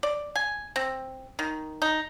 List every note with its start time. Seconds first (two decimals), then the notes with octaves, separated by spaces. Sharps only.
0.03 D5
0.36 G#5
0.76 C4
1.39 D#3
1.82 D#4